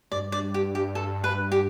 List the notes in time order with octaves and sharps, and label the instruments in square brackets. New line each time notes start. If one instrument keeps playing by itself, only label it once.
[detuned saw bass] G2 [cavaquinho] D5
[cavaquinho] D5
G4
G4
A4
B4
G4